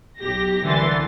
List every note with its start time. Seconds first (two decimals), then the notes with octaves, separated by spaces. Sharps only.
0.18 B1 G4 A#6
0.64 C2 D3 E3 C6 A6